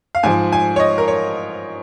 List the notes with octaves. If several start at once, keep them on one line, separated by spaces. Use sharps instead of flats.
F5
G#2 F3 G#5
G#5
C#5
D#5
A#4
C#5